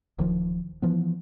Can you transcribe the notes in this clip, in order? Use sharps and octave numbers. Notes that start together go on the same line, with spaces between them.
D1 D#3 F3
E3 F3 B3